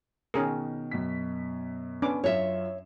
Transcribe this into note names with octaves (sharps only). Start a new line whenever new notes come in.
B2 D#3 C#4 G#4 A#4
F#2 B2 B6
B3 C#4 D4 D6
F#2 F4 C#5 E5 E7